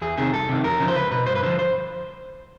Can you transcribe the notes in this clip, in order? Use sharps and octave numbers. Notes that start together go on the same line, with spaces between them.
E2 G#4
C3 D#3 G#4
C2 A4
C3 D#3
F2 A#4
C#3 F3
C5
C#2 B4
B2 B4
G2 C5
B4
D3 F3 C5
C5